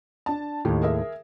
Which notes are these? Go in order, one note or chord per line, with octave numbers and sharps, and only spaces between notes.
D4 A5
D#2 A2 D#3 G4
G#4 A#4 E5